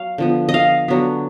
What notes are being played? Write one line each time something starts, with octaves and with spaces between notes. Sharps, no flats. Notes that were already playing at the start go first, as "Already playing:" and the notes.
Already playing: F#3 F5
D3 F3 B3
D#5
F5
D3 F#3 B3